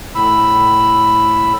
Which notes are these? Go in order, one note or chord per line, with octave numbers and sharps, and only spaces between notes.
A2 B5 E6